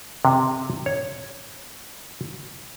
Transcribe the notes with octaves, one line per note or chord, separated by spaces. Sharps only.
C3
C#5